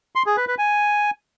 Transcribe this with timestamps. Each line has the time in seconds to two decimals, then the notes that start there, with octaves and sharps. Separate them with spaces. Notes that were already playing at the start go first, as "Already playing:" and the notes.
0.15 C6
0.26 G#4
0.37 B4
0.48 B4
0.58 G#5